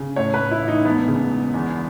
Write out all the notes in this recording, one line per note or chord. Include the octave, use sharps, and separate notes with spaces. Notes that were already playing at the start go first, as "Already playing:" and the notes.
Already playing: C#3
A2 C#5
B4
A2
E4
A1
D#4
E1 B3
C#3
E1
E2